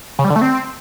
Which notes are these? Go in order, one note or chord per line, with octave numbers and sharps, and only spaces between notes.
C#3
G3
D3
A3
C4